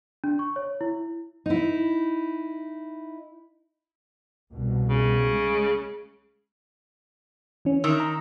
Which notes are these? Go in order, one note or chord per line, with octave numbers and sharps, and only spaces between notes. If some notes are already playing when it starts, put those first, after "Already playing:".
D4
C#6
C#5
E4
D#4 E4
C2 B2
C#3
G#3
E3 C#4
D#3 E6
A#5